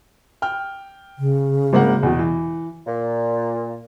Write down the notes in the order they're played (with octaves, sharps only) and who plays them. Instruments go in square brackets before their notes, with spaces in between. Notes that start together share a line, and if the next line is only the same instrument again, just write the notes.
[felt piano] G5 F6
[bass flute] C#3
[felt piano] G#1 A#3 F#5
E2 B2
E3
[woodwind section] A#2